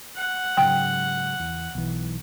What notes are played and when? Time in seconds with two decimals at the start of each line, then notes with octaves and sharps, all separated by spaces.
0.16 F#5
0.57 G#2 C#3 F#3 G5
1.40 E2
1.75 B1 E3